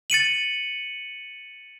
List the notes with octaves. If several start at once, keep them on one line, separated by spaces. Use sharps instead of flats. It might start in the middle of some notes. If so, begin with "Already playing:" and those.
A6 C#7 D#7 F#7